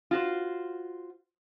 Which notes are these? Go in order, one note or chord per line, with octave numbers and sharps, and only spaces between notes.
F4 F#4 C5